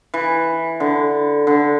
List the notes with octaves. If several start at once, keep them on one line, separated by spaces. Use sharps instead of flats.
E3
D3
D3